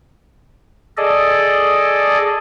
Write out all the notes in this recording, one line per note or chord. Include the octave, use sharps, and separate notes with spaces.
G#4 A4 D5 D#5